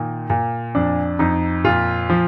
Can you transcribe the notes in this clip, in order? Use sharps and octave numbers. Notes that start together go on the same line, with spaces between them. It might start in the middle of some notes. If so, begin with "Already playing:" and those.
Already playing: A#2 D#3
A#2
F2 D4
F2 D#4
A#2 F4
F3